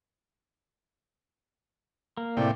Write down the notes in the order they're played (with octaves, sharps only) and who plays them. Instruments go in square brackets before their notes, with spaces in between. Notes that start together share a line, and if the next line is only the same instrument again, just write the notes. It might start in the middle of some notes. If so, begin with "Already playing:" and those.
[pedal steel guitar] A#3
[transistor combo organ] A2 C3 G5 [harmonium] E4 D5